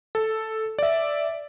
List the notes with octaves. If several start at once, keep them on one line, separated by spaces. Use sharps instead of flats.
A4
D5 E5